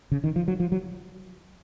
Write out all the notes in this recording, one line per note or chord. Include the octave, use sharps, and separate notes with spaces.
C#3
D#3
F3
F#3
F3
F#3